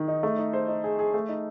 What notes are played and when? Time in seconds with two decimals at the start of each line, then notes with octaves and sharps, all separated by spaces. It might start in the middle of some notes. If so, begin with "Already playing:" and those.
Already playing: D#3
0.08 D#4
0.23 A3
0.38 D#4
0.53 C5
0.68 D#4
0.84 G#4
0.99 G#4
1.14 A3
1.29 D#4